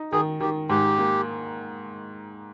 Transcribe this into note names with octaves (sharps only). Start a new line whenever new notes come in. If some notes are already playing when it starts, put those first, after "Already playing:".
Already playing: D#4
D#3 G#4
D#3 G4
G#2 G4
A#3